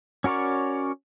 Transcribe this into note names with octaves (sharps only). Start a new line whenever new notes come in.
C#4 F#4 A#4 C#5 D5